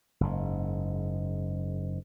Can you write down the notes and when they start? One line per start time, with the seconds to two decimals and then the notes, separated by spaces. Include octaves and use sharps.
0.21 F#1 G#2